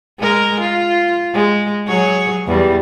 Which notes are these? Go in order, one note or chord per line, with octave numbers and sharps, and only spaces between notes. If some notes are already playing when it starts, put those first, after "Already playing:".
G#3 A#4
F4
G#3
F#3 G#4 C#5
E2 E3 G3